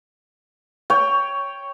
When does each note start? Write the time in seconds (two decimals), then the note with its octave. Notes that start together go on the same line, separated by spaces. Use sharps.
0.90 C#5 G5